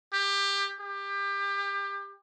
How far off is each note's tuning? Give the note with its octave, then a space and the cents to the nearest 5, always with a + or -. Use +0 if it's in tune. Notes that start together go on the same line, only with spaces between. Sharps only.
G4 +20
G4 +25